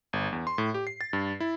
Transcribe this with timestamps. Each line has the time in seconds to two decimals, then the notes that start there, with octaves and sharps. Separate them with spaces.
0.13 G1
0.32 E2
0.47 C6
0.58 A2
0.74 G4
0.87 C7
1.01 A6
1.13 G2
1.40 E4